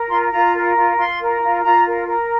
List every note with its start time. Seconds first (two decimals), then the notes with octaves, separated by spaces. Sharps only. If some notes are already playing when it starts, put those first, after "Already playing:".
Already playing: A#4
0.09 F4 C6
0.32 F4 A#5
0.55 A#4
0.76 F4
0.97 F4 C6
1.20 A#4
1.42 F4
1.63 F4 A#5
1.86 A#4
2.08 A#4